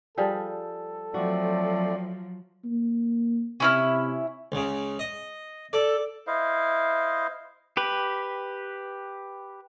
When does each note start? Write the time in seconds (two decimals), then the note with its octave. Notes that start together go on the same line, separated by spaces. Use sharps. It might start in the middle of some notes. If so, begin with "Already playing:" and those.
0.18 F3 G3 G#4 A4
1.14 F3 F#3 A3 C4 F#4 D5
2.65 A#3
3.60 C3 C#4 E4 F6
4.52 C#2 C#3
4.99 D#5
5.73 A4 D5
6.27 E4 C5 D#5 F5
7.77 G4 B4